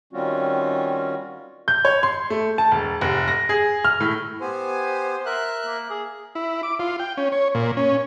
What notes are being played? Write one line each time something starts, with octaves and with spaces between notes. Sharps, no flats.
D#3 G3 C4 C#4 F4 F#4
G6
C#5
C6
A3
A5
E1
F1
A#6
G#4
F6
A2
B3 G4 C5 G#5
A#4 E5 F#6
A#3
G#4
E4
D6
F4
G5
C#4
C#5
A#2
C#4